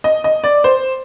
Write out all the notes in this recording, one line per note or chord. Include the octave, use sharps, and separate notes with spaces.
D#5
D#5
D5
C5